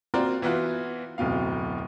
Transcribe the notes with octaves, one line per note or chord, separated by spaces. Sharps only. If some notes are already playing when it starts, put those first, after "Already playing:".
A#3 C4 F4 F#4 A#4 D5
E3 B3 F4 F#4
D1 F2 B2 F5